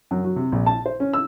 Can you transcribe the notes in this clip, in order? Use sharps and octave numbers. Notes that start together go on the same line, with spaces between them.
F#2
F#3
C3
A#1
A5
C5
C#4
E6